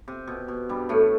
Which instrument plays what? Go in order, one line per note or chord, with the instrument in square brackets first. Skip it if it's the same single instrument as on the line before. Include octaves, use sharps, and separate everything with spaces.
[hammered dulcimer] C3
B2
B2
G2 G3
A2 A3